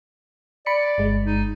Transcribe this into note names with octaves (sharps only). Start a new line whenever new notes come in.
D5 B5 C#7
G1 G#3
D#4